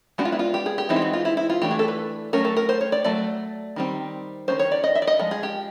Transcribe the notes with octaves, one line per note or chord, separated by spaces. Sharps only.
G#3 B3 D4 F#4
F4
E4
F4
G4
G#4
G4
E3 G#3 C4 D#4 E4
G4
F#4
F4
E4
E4
F4
E3 A3 D4 G4
G#4
A4
B4
F#3 A3 C#4 A#4
A4
A#4
C5
C#5
D5
F#3 A3 D5
D#3 G3 C4
D#3 G#3 C#4 C5
C#5
D5
D#5
E5
D5
D#5
F3 G#3
G#4
G4